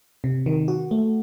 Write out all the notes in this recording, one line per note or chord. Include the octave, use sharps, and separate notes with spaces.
C3
D#3
F#4
A3